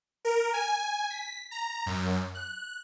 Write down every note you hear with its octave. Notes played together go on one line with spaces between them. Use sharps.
A#4
G#5
B6
A#5
F#2
F#6